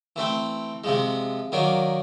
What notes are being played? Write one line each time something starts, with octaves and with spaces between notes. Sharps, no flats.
E3 A3 C4
C3 F3 G#3
D#3 F#3 A#3 D4